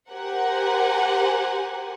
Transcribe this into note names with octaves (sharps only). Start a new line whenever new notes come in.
G4 A#4 C5 F#5 G#5